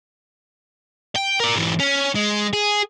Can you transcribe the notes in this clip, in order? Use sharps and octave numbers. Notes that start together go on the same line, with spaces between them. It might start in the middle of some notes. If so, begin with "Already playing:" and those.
G5
A#4 D5
G#2 E3
C#4
G#3
G#4